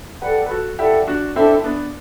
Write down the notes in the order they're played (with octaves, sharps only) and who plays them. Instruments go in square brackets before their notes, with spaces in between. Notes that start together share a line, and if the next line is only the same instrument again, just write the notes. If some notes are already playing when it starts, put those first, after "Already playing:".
[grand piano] G4 B4 [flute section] A4 D5 F#5
[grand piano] B4
F#4 A4
[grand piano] E4 G4 [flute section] A4 D5 F#5
[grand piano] D4 F#4
[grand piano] C4 E4 [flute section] D4 A4 E5
[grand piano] E4
B3 D4